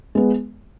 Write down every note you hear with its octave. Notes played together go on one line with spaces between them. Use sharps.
G#3 B3